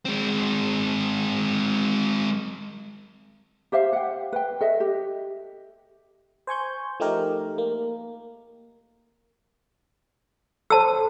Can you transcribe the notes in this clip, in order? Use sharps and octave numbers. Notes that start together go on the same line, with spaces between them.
G#3 C4
G4 C5 E5 F5
F#5 G5
B4 G5
A4 D#5 E5
G4
C5 G#5 C#6 G6
F3 A3 D#4 G4 A#4
A#3
A4 C5 A5 E6